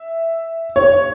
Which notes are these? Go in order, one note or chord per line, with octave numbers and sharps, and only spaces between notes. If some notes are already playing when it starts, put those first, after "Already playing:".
Already playing: E5
C#5